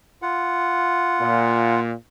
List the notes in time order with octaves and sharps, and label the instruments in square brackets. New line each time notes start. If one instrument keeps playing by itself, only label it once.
[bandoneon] F4 F#5
[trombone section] A#2